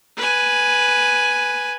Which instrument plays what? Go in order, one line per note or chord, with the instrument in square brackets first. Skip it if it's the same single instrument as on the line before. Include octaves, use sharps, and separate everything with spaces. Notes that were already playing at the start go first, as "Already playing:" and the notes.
[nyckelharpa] B4 G#5